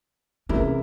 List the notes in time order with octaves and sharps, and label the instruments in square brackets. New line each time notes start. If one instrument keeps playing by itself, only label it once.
[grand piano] C3 E3 G#3 E4 A#4 [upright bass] C#4